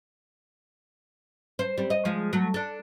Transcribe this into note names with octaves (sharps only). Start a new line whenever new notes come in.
C5
G3 C4
D#5
F3 G#3
F#3 A3
D4 A4